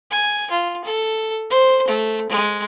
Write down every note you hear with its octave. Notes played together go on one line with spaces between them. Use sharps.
G#5
F4
A4
C5
A3
G#3